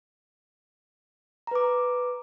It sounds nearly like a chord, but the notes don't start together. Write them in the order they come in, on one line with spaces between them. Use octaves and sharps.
A#5 B4 D6